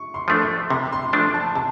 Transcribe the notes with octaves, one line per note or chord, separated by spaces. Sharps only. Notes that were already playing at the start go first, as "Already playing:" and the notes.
Already playing: C#6
C6
F3 A3 D4
C6
C3 B5
C6
F3 A3 D4
A5
C3 A5